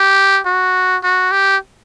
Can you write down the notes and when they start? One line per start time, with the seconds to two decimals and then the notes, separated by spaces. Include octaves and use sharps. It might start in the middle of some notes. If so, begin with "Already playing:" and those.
Already playing: G4
0.46 F#4
1.04 F#4
1.32 G4